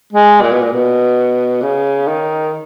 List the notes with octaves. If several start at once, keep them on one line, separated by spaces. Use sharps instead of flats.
G#3
A#2
B2
A#2
B2
C#3
D#3